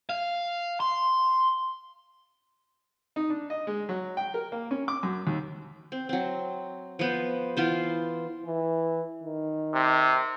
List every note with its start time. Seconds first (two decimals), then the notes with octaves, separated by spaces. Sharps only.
0.10 F5
0.80 C6
3.16 D#4
3.30 D4
3.50 D#5
3.67 G#3
3.89 F#3
4.17 G5
4.34 A#4
4.52 A#3
4.71 C#4
4.88 D6
5.03 F#2
5.27 D#2
5.92 C4
6.09 F#3 C4
6.99 F3 B3 C5
7.57 E3 B3 F4 C5
8.45 E3
9.23 D#3
9.74 C3